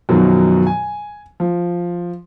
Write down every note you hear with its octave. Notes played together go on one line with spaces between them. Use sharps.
F#2 B2 D#3 F3 F#3
G#5
F3